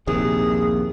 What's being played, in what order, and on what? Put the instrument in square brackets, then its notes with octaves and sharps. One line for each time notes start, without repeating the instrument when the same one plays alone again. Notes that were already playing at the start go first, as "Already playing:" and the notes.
[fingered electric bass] A#1 D#2 C3 [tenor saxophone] G#4